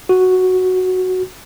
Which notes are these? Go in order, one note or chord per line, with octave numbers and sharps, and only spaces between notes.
F#4